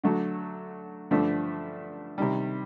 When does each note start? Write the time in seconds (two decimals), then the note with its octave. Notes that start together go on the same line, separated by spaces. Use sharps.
0.04 D3 F#3 A3
1.11 G2 D3 F3 A3 D4
2.18 C3 D#3 G3